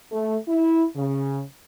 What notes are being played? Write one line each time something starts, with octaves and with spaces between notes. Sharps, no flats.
A3
E4
C#3